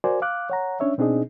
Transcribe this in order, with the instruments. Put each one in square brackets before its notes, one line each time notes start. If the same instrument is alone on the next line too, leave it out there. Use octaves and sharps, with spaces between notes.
[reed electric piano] F#4 A#4 C5 D5 G#5
F5 D6 F#6
C#5 F#5 A#5
C#4 D4 C#5 E5
B2 C4 D4 D#4 G#4 D#5